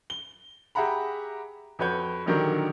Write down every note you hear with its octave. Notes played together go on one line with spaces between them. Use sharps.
G7
G4 G#4 E5 F#5 A#5 B5
F2 F#4 B4 C#5 G6
A#1 D3 D#3 F#3 G4 A#4